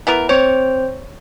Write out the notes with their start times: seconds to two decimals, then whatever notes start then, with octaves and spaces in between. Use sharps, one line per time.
0.07 E3 B3 A#4
0.29 C4 C5 C#5